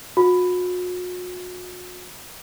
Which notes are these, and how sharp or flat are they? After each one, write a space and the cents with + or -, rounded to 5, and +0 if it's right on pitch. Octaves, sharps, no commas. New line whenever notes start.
F#4 -40